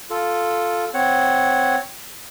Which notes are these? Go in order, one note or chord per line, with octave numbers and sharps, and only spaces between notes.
F4 A4
C4 C#5 F#5